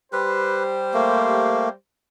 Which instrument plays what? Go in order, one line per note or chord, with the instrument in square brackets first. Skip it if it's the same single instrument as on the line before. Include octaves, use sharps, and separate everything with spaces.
[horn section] G3 G4 C5 [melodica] B4
[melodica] A3 A#3